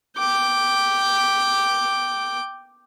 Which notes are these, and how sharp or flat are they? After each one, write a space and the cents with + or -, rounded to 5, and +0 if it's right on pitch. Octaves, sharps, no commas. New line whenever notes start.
G5 +0 D6 +0